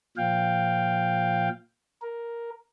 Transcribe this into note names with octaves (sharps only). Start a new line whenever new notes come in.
A#2 F3 F5 G5
A#4